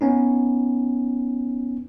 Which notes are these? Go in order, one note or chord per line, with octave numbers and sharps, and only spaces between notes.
B3 C#4 D#4